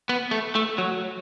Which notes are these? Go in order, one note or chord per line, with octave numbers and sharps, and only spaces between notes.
B3
A3
A3
F#3